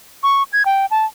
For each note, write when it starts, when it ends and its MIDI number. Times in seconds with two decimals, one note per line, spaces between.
0.23 0.43 85
0.53 0.63 92
0.66 0.86 79
0.91 1.05 81